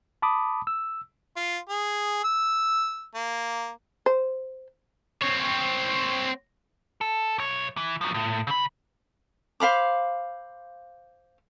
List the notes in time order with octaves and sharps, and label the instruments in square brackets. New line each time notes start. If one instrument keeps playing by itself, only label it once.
[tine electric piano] A5 B5 D6 D#6
E6
[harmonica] F4
G#4
E6
A#3
[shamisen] C5
[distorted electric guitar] C4 C#5
[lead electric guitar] A4
B1 C#5
E3
F3 F#3
A2
C#3 B5
[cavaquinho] C5 F5 B5 D6